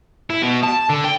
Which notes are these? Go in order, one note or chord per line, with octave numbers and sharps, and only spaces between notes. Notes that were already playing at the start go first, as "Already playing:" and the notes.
E4
B2
A5
D3
G5